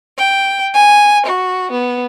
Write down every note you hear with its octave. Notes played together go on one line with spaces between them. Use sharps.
G5
G#5
F#4
B3